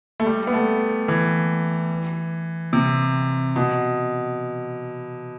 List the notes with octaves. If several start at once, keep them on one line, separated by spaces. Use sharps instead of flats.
A3
G3
B3
A3
E3
C3
B2